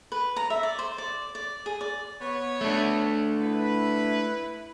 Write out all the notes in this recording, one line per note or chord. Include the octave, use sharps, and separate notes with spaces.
B4
A#5
E5
D5
C5
D5
D5
G#4
D5
B3 C#5
A3 D4
E4 B4